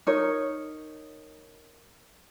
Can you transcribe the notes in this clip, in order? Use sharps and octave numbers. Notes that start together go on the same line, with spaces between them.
D#4 A#4 C#5